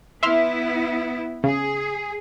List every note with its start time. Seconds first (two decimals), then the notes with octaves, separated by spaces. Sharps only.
0.23 B3 E4 E5 C6 F6
1.44 C#3 G#4